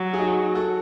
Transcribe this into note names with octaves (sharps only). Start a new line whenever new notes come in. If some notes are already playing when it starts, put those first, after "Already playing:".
Already playing: F#3
G#4
D#4 F#4
F#4 A4